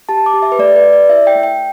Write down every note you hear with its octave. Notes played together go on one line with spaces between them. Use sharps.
G4 A5
D6
G4
E5
B4
A3 D5
B4
G4
D5
E4 E5
G5
A3
G5